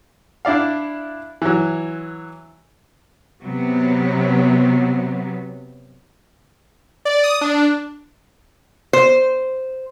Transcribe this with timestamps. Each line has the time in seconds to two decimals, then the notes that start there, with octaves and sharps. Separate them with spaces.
0.45 D4 E4 D5 F5
1.42 E3 F#3
3.43 C3 F#3 B3
7.05 D5
7.24 D#6
7.41 D4
8.93 C5